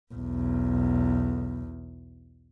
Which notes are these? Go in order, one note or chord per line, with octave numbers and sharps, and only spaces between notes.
B1 E2